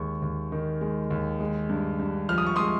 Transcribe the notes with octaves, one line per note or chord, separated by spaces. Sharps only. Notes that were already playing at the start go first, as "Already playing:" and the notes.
Already playing: D#2 G#3 C#6
D#2
D#3
G#3
D#2
G#3
G2
G2
F3 F6
D#6
C#6
G#3 C6 D#6